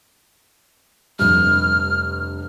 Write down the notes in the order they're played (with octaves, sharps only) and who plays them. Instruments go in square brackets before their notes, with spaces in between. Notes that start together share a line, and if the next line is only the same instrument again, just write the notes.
[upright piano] F1 G2 [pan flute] F6